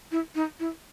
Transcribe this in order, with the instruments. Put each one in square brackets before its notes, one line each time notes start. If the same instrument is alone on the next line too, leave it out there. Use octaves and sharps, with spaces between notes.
[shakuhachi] E4
D#4
E4